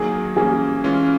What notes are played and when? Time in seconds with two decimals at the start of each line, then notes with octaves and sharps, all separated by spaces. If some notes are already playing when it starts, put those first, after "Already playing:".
Already playing: D#3 F#3 A#3 G#4
0.36 E3 G3 A#3 C#4 G#4
0.84 E3 G#3 C#4 F4